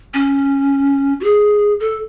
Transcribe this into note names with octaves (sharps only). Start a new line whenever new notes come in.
C#4
F#4
G#4
A4